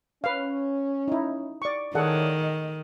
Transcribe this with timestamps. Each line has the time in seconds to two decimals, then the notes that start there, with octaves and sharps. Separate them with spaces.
0.24 C#4 B4 F5
1.08 D#4 E4
1.62 D5 C#6
1.95 D#3 E4 G#4 A4 C#5 D5 F#5
2.42 D#5